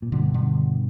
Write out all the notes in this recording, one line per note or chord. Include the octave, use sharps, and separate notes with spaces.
A#2
G2 B2 D3
D3